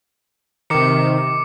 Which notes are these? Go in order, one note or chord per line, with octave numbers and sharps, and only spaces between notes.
C3 D#3 D6 C#7